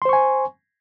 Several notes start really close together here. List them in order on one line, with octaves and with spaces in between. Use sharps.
C6 C5 C#6 G#5